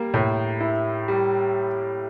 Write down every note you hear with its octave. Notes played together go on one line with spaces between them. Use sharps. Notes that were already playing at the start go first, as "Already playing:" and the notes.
Already playing: G3 A#3
A2
E4
G3